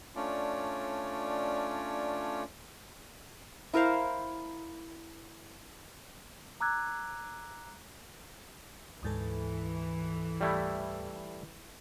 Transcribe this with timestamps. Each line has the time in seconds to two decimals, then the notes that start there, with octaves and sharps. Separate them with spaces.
0.16 A3 C#4 D4 F4 C#5 D5
3.74 E4 A#4 C5 F5
6.60 A#5 D6 E6 F#6 G#6
9.03 D2 G#2 E3 A4
10.41 G3 A3 E4